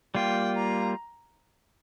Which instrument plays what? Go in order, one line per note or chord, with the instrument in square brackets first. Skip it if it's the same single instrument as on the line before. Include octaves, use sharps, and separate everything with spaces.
[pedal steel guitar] G3 A#3 F4 [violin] G5
[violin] A#5